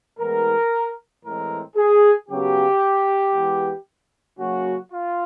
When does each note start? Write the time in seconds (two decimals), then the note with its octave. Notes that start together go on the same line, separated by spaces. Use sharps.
0.19 A2 E3 G#3 B3 A#4
1.24 A2 E3 G#3 C4 A#4
1.76 G#4
2.29 C#3 F#3 B3 G4
3.34 E3 G#3 B3
4.39 C#3 F#3 A#3 C#4 F#4
4.92 F4